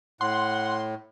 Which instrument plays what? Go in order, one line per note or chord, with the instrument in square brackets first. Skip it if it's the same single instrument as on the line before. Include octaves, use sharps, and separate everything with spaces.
[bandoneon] A2 [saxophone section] F#5 [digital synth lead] C6